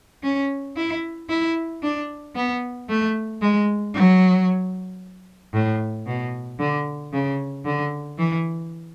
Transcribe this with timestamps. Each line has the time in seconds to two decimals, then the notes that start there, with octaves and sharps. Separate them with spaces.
0.23 C#4
0.76 E4
1.30 E4
1.83 D4
2.35 B3
2.89 A3
3.41 G#3
3.94 F#3
5.53 A2
6.06 B2
6.59 D3
7.12 C#3
7.65 D3
8.18 E3